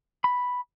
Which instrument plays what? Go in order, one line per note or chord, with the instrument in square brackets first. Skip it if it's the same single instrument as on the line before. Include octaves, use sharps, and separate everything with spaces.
[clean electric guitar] B5